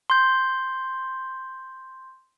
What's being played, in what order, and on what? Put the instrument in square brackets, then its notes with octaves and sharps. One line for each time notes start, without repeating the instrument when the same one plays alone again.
[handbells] C6 G6